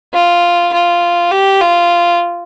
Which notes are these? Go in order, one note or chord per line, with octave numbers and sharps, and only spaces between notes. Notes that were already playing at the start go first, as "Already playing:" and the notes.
F4
F4
G4
F4